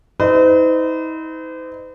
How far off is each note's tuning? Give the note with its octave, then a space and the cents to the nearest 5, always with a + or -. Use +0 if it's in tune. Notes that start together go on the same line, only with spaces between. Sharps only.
D#4 +45 C5 -45 D#5 -40